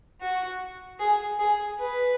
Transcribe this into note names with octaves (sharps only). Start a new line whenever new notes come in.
F#4
G#4
G#4
B4